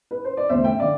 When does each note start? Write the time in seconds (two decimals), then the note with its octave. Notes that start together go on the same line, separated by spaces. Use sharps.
0.11 B4
0.25 C5
0.37 D5
0.49 E2 D3 A3 C5 E5
0.64 E5 G5
0.80 D3 D5 F5